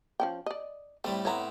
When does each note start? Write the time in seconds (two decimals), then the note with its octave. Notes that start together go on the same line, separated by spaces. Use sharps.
0.20 F3 C#4 G5
0.46 D5 D#5
1.04 A2 G3 A3 C4
1.25 A2 B3 C4 C#5 A#5